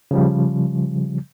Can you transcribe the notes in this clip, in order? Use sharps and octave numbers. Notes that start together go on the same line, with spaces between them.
C#3 F3 G3